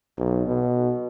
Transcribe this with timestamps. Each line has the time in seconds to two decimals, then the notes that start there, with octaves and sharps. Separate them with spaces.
0.18 B1
0.47 B2